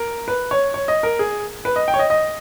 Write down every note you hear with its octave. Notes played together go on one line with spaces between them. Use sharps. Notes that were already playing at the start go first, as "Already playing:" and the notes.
Already playing: A#4
B4
C#5
C#5
D#5
A#4
G#4
B4
D#5
G5
C#5
D#5
D#5